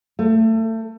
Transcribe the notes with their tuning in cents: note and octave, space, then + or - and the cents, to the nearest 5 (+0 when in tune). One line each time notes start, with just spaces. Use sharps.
A3 +25